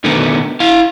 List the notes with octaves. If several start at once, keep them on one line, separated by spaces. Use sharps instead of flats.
B2 D3 D#3 A3 B3
E4 F5